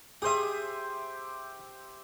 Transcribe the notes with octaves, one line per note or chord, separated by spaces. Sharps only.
G4 G#4 C5 E5 D#6